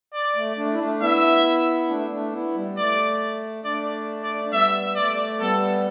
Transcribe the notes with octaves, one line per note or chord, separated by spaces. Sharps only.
D5
A3
A3 D4
E4
A3 D4
B3 E4 E5
A3 D4
A3 D4
B3 E4
G3
A3 D5
A3 D4 D5
D5
D4
G3 B3 E5
A3 D5
G3 B3 A4